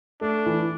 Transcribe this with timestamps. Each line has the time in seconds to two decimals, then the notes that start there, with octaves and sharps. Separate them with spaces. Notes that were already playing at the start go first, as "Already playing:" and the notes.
0.21 A3 D4
0.46 E3